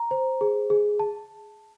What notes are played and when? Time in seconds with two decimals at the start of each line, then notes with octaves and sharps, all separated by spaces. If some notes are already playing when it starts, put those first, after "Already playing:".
Already playing: A#5
0.11 C5
0.41 G#4
0.70 G#4
1.00 A5